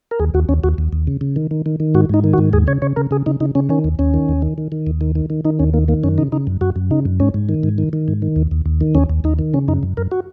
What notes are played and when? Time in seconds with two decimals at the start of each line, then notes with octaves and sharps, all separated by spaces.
0.11 A#4
0.19 D#2 G#4
0.34 D#2 F#4
0.49 D#2 C#4
0.64 D#2 F#4
0.78 D#2
0.93 D#2
1.07 C#3
1.21 C#3
1.36 D#3
1.51 D#3
1.66 D#3
1.80 D#3
1.95 G#2 F#4
2.10 G#2 D#4
2.24 D#3
2.33 F#4
2.38 G#2
2.53 D#2 G#4
2.67 C#3 C#5
2.82 C#3 C#5
2.96 C#3 A#4
3.11 C#3 G#4
3.26 C#3 D#4
3.40 C#3 D#4
3.55 C#3 C#4
3.69 D#3 C#4
3.84 D#2
3.99 D#2 C#4
4.14 D#3
4.29 D#2
4.42 D#3
4.58 D#3
4.72 D#3
4.87 D#2
5.01 D#3
5.15 D#3
5.30 D#3
5.45 D#3 D#4
5.59 D#2 C#4
5.73 D#3 A#3
5.88 D#3 A#3
6.03 F#2 C#4
6.18 C#3 D#4
6.32 C#3 D#4
6.47 F#2
6.61 F#2 F#4
6.76 F#2
6.91 C#3 D#4
7.05 F#2
7.20 G#2 C#4
7.34 G#2
7.49 D#3
7.63 G#2
7.78 D#3
7.93 D#3
8.08 G#2
8.22 D#3
8.36 D#2
8.51 D#2
8.66 D#2
8.81 D#3
8.95 D#2 C#4
9.10 D#2
9.24 D#2 D#4
9.39 D#3
9.54 C#3 C#4
9.68 F#2 D#4
9.83 F#2
9.97 F#2 A#4
10.11 F#4